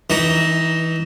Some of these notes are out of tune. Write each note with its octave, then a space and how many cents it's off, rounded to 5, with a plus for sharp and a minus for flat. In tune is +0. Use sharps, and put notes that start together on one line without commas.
E3 -20 D#4 +0